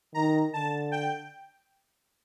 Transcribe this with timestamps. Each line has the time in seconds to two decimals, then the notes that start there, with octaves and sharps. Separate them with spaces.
0.13 D#3 A#5
0.53 D3 A5
0.92 G5